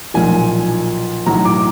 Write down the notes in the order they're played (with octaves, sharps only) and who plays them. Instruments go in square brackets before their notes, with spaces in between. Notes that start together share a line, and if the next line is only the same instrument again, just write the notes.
[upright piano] B1 A#2 F3 G#5
B1 A2 F#3 A#5
D6